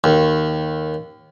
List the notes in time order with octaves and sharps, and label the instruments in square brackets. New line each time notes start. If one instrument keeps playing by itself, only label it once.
[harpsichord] D#2